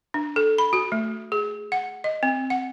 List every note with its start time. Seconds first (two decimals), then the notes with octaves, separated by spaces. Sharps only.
0.14 D4
0.36 A4
0.58 B5
0.73 F#4
0.92 A3
1.32 G#4
1.72 F#5
2.04 D#5
2.23 C4
2.50 F#5